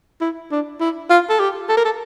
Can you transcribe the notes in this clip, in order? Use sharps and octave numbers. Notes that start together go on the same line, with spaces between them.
E4
D4
E4
F4
A4
G4
A4
A#4
A4